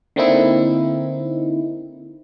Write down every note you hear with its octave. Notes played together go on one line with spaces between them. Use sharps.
D3 A#3 C4 D#4 E4